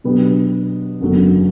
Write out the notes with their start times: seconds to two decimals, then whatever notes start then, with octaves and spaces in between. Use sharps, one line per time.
0.04 B2 F#3 B3 D4 G4
1.01 F#1 E2 D3 F#3